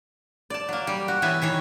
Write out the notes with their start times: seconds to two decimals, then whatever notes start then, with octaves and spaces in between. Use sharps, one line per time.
0.50 D5 A5
0.69 F#3 A#3
0.87 G3
1.08 F#4
1.22 E3 B3 E4 C#5 E5 G#5
1.42 D#3 E3 C#5